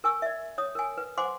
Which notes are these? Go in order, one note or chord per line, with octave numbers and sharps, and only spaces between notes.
A#4 G#5 C#6 E6
D5 E5
C#5 D#6
A#4 G#5
B4
C5 F#5 G#5 C6 D6